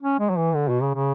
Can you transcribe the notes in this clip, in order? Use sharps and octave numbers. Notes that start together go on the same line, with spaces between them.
C#4
G#3
F#3
E3
D3
B2
C#3
C#3